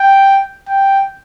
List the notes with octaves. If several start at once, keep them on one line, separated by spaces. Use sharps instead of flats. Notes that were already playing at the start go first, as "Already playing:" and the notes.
Already playing: G5
G5